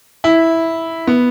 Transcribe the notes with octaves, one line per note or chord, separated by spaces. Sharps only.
E4
B3